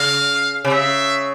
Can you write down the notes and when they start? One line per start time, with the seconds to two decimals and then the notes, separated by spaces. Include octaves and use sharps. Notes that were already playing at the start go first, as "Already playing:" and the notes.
Already playing: C#3 F5
0.65 C3
0.72 C#3 E5